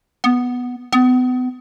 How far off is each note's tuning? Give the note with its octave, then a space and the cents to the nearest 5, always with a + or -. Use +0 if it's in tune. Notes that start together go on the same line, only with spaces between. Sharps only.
B3 +0
B3 +35